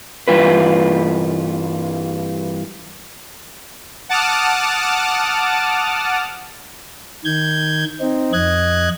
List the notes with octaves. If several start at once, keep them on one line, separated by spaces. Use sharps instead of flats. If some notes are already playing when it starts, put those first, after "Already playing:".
G2 E3 F4 B4
F#5 A5 D6 D#6 F6
D#3 G6 G#6
C4 D#4
F2 D#5 F#6 G#6